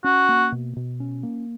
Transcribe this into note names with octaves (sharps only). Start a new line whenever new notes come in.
C#4 F#4
A#3
B2
B2
C#4
A#3